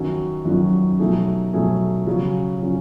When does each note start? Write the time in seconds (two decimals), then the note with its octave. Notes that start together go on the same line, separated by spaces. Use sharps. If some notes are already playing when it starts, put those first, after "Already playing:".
Already playing: F#2 D#3 F#3 C#4 F#4
0.45 F#2 D#3 F#3 C#4 F#4
0.99 B2 F#3 A3 D#4 G#4
1.53 B2 F#3 A3 D#4 G#4
2.07 C#3 F#3 C#4
2.61 C#3 F#3 C#4